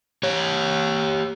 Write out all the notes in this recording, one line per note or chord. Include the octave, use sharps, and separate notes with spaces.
G4 C#5